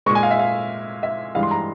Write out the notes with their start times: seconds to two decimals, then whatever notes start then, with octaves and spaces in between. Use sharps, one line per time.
0.06 G#3 C#6
0.09 A#2
0.15 G#5
0.23 F5
0.31 E5
0.39 F5
1.03 E5
1.35 G2 E3 G#3 F5
1.43 C6
1.51 A#5